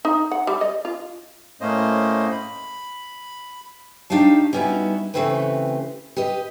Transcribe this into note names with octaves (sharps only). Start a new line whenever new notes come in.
D#4
F#5
G3
D#5
F4
A2 A3 A#3 C#4 C5 D#5
B5
D4 D#4 G4 C#5 F5 A5
G3 B3 C#4 D#4 E4 F#4
C#3 E3 A3 C4 G4 B4
G4 B4 D#5